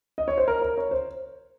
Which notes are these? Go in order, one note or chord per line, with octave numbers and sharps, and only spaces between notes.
D#5
C#5
C5
A#4
A#4
C#5
C5